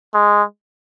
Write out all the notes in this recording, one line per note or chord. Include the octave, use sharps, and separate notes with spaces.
G#3